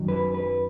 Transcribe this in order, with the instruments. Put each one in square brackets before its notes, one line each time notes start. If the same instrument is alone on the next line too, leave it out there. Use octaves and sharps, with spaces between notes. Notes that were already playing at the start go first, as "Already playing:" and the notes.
Already playing: [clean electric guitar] F#2 D#3 F#3
B4
B4